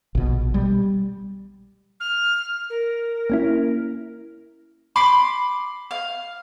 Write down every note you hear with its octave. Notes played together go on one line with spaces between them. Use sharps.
A#1 B2
G3
F6
A#4
A#3 C#4 E4
B5 C6 D6
F5